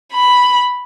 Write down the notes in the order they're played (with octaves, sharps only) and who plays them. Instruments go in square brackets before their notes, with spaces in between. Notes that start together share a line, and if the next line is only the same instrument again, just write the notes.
[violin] B5